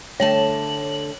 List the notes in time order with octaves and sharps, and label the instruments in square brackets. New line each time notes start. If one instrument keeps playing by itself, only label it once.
[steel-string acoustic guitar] D3 A3 A5 [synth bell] C#5 F#7